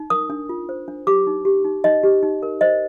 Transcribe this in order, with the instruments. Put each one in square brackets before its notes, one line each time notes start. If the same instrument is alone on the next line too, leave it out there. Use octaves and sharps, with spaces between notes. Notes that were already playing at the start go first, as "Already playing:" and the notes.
Already playing: [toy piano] D#4
A#4 D#6
D4
F4
C5
D4
G4 D6
D#4
G4
D#4
D#4 D#5
G4
D#4
A#4
C5 D#5